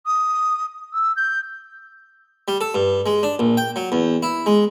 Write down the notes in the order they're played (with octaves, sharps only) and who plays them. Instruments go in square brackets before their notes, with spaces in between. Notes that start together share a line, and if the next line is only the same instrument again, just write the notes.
[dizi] D#6
E6
G6
[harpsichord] G3
A4
G2
G#3
D4
A#1
G5
F#3
E2
E4
G#3